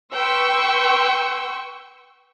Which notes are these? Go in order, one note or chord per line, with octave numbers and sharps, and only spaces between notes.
B4 G5 C6 C#6 E6